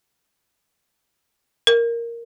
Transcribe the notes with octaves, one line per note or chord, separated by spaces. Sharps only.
A#4